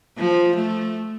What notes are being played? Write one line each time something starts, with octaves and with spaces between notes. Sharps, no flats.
F3
A3